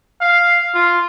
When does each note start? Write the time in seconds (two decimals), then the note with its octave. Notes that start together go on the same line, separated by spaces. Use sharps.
0.21 F5
0.74 F4